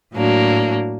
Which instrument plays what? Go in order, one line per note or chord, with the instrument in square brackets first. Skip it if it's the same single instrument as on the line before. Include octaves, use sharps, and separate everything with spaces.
[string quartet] A2 F#3 A#3 D4